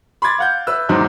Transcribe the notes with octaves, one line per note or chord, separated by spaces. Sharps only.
B5 C6 D6 G#6 A6
F5 F#5 G6
B4 E5 E6
E2 G#2 D#3 F#3 C5 D6